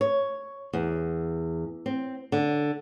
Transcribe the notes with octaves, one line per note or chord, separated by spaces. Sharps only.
C#5
E2
C4
D3